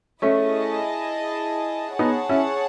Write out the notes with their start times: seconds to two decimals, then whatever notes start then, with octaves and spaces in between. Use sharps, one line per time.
0.22 A3 C#4 E4 G#4 D#5 A5
1.99 B3 D#4 G#4 C#5 F#5 A5
2.29 C#4 E4